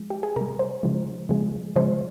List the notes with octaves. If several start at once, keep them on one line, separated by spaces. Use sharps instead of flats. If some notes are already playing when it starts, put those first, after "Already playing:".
Already playing: F3 G#3
G4
G#4
C3 G3 A#4
C5
C#3 F3 G#3
C#3 F3 G#3
C#3 F3 G#3 C5